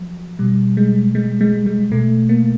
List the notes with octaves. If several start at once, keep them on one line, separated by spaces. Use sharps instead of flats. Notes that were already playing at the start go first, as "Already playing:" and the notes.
Already playing: F3 F#3
B2 G3
G#3
G#3
G#3
G#3
B2 A3
A#3